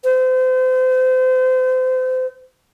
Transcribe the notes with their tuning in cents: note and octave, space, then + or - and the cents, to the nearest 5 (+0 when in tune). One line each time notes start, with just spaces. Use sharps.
C5 -35